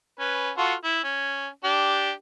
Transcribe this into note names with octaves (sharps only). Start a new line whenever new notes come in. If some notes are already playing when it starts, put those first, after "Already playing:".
C#4 B4
F4 F#4 A4
E4
C#4
D4 G4